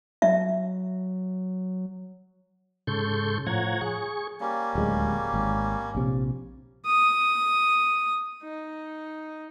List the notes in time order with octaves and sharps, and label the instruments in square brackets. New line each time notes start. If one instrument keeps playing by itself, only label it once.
[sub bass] F#3 [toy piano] E5
[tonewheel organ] G#2 C#3 A4 C6 C#6 G6
A2 F3 C#5 F#5 A#5 G#6
G#4 C#6
[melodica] G3 A#3 C#4
[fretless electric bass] D1 C#2 G#3
G#1
A#1 C3
[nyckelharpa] D#6
D#4